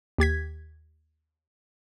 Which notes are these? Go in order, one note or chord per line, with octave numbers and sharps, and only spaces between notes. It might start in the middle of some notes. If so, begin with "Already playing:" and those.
D#2 G4 G#6 B6